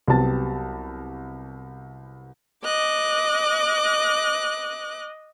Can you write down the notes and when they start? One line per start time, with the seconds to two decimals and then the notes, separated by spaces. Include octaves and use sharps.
0.08 C2 F#3 B3 G4 A5 A6
2.64 D#5 D6 F#6